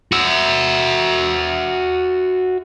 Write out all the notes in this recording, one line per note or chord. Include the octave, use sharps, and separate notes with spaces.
F#4 E5